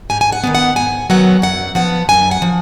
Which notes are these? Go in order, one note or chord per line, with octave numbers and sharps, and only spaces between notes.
G#2 G#5
G#5
F#5
D#3 F#3 B3
F#5
G#2 G#5
D#3 F#3 B3 F#5
F#2 F#5
F3 B3 F#5
F#2 G#5
F#5
F3